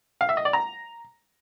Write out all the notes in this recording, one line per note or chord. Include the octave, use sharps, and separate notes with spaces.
F5
E5
D#5
D5
A#5